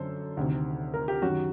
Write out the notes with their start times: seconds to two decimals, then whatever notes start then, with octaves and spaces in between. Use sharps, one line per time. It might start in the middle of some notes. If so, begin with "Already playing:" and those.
Already playing: F#2 D3 A4 C5
0.37 D2 C3 D#3
0.94 A#4
1.08 G4
1.22 F#2 D#3 F#4